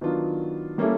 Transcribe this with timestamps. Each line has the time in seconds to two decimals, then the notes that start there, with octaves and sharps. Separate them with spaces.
0.01 D#3 F#3 B3 D4 F4
0.78 G3 A#3 C#4 E4 A4